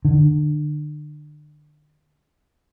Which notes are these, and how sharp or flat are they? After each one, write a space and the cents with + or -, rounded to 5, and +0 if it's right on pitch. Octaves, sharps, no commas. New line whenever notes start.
D3 +35